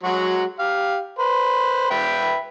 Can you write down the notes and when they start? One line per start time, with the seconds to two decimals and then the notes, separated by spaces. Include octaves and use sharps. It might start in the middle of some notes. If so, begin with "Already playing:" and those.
0.04 F#3 G#3 F#4
0.59 G4 F5
1.19 B4 C5
1.90 B4 E5 G5